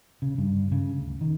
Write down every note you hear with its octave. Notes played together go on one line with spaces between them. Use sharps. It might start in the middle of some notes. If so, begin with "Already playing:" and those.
C#3
G2
C#3
D2
D#3